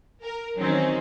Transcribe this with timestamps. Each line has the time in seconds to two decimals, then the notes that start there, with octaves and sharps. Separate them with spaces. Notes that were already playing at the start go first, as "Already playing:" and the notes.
0.23 A#4
0.59 D#3 E3 F#3 C4 C#4 D#4